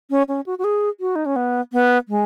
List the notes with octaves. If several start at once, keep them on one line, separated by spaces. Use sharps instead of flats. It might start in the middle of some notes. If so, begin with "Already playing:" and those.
C#4
C#4
F#4
F#4
G#4
F#4
D#4
C#4
B3
B3
G#3